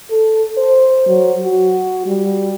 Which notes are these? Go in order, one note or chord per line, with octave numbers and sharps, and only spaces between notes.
A4
C5
F#3
F#4
G3